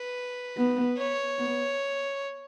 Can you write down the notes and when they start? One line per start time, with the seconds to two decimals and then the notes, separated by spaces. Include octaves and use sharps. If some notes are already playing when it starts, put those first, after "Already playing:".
Already playing: B4
0.57 B3
0.97 C#5
1.38 B3